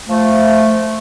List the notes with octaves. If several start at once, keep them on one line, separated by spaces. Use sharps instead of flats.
F3 A3